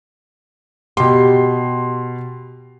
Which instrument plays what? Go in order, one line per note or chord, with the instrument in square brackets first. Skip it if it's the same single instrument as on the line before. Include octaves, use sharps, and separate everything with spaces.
[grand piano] B2 C6 [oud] G4